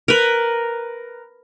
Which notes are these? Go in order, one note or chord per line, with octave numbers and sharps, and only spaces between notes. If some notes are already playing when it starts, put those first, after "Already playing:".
A#4 B4